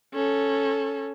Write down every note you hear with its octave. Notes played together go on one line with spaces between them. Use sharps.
C#4 A4